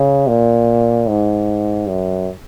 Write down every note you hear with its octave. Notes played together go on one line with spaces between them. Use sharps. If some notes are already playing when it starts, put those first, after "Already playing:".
Already playing: C#3
A#2
G#2
F#2